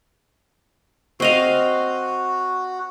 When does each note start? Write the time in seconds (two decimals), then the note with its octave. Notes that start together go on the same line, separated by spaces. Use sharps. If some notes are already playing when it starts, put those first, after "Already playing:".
1.20 C4 F#4 D#5 F5